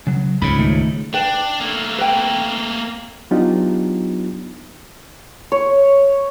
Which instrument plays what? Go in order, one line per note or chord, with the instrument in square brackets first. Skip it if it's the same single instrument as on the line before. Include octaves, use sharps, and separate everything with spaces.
[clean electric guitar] C#3 F#3
[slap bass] C#2 G#2 C#3 [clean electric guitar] B5
[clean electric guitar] D#3 A3 D#4
[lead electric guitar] D4 [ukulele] B4 G5
[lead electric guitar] A3 A#3
[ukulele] B4 G5
[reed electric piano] F#3 B3 D4 D#4 F4 G4
[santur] C#5